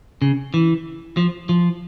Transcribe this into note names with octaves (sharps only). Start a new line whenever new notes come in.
C#3
E3
F3
F3